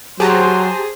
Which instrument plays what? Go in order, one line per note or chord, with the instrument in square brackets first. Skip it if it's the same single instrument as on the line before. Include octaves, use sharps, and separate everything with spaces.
[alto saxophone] F#3 [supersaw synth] G4 A5 A#5 [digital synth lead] G#4 [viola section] C5